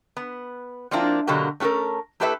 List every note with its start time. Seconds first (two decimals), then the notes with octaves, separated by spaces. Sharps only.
0.17 B3
0.91 F3 A#3 C4 D4 E4 F4
1.27 B2 D3 F#3 A#3 G4
1.60 A3 C#4 F#4 A4 A#4
2.20 A3 E4 G4 A4 B4 E5